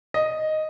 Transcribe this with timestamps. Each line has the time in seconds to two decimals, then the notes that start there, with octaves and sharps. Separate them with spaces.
0.14 D#5